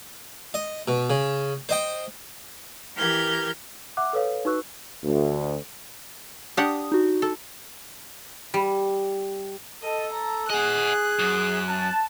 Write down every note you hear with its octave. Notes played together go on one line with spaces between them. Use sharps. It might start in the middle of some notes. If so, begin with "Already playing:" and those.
D#5
B2
C#3
C5 D#5 G5
E3 G4 A#4 F6 G6 G#6
E5 F#5 D6 F#6
A4 B4 C#5 F5
D#4 F#4 B4 C#6 E6 F#6
D2
D4 G4 F#5 D#6
D#4 F#4
A4
G3
A4 D#5
A#5
G#4 D#5 F#5 F#6
F#2
A5